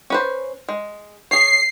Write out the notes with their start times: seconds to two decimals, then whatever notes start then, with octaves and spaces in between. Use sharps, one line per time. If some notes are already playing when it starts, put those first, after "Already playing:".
0.10 C#4 B4 C5
0.69 G#3
1.31 G#4 C#5 C7